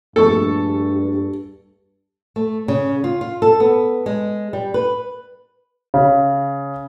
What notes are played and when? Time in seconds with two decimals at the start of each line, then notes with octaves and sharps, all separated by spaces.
0.16 A#1 G2 A3 A4 C#6
2.36 A3
2.68 C#3
3.04 F4
3.21 F4
3.42 A4
3.60 B3
4.06 G#3
4.53 G3
4.74 B4
5.94 C#3